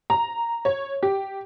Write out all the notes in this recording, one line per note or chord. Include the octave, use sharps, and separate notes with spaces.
A#5
C#5
G4